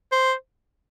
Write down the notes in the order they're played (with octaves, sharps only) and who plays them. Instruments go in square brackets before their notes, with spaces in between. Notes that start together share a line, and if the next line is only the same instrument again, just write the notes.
[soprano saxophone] C5